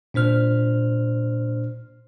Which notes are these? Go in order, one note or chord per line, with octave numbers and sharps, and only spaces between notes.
A#2 D4 C5 F6